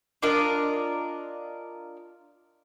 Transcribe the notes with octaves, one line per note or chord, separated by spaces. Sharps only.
D4 F4 A#4 D#5